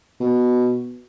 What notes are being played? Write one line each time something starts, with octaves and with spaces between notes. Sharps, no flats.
B2